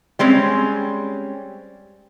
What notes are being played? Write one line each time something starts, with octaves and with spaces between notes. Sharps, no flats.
G3 G#3 C4 C#4